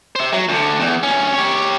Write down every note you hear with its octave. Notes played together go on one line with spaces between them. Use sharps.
C5 E5
F#3
D2 D3
E2
D2 C#4
G4 C#5